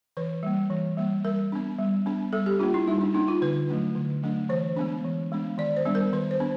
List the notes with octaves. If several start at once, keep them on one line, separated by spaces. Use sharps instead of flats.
E3 B4
G3 A#3
E3
G3 A#3
G3 A#4
B3 D4
G3
B3 D4
G3 A4
G4
A#3 D4 F4
E4
G3 D#4
D4
A#3 D4 D#4
F4
D3 B4
F#3 A3 D4
D3
F#3 A3 D4
E3 C5
G#3 B3 D4
E3
G#3 B3 D4
D#3 D5
C5
G3 B3 D4
A#4
D#3 B4
C5
B3 D4